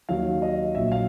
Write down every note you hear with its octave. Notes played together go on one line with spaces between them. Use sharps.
D#2 D#3 F#3 F5
D#5
A#1 A#2 F#3 E5
F5